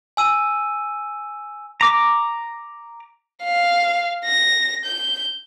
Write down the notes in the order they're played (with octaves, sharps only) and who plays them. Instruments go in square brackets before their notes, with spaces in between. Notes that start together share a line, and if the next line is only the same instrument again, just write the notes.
[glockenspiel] G#5 E6 D#7
[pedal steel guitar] A#5 D6
[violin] F5
A#6
G6